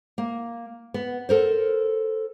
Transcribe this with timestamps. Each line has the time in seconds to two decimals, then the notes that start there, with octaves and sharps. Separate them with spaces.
0.18 A#3
0.94 B3
1.29 A4 A#4 C5